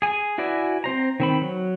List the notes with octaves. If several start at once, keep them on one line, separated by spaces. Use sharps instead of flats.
G#4 G#5
E4 F#4 B4 D5 G#5
C4 C5 A#5
D#3 C4 B5
F#3